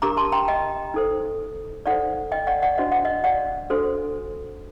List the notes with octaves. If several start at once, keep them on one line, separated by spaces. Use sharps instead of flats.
D4 G4 A#4 A#5 D6
A5 C6
G5 A#5
D#5 G5
D#4 A4 C5
D#4 A4 C5 D5 F#5
D#5 G5
D5 F#5
D5 F#5
D4 F#4 C5 D#5
F#5
D#5
D5 F#5
D4 F#4 A4 C5